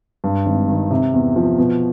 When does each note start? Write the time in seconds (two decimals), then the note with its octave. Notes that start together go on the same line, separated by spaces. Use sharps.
0.24 G2
0.46 G#1
0.68 D#3
0.90 C3
1.13 E2
1.36 F3
1.58 B2